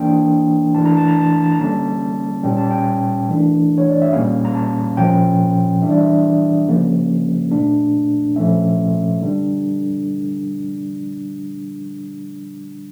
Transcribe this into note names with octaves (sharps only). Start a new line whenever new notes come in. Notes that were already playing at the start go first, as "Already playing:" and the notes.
Already playing: E3 A#3 D4 G5
E3 A3 D4 A5
A#5
A5
A#5
A5
A#5
A5
A#5
D3 G3 A#3 C#4 A5
A#2 G3 C#4 G5
A5
G5
E3 A3 D4
C#5
D5
E5
A#2 G3 A#3 C#4 F5
A#5
A5
A#2 F3 C#4 G5
E3 G3 D4 E5
D5
E5
C#3 F3 A#3 C#4
A#2 A3 D4
A#2 F3 A3 C#4 E5
D3 G3 D4